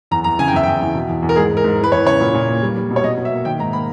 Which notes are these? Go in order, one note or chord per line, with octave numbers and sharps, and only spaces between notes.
E2 A#5
E2 A#5
C#3 G#5
G5
E2 E5
E2 G5
E2
B2
E2
E2
A#4
G#2 G#4
G#2
A#4
G#2
E3
B4
E2 C#5
C#3 C#5
A#2
A#2
A#3
G3
G3
B2
C#5
B2 D#5
B2
E5
A#3
D#3 G5
G#2 A#5
A#3 B5